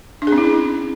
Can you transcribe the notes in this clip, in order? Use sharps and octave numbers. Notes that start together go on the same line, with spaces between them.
D4
G#4
C4
E4
C#4